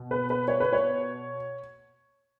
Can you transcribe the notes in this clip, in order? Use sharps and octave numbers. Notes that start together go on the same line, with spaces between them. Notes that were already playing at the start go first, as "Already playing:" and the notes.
Already playing: B2
B4
B4
C#5
B4
C#5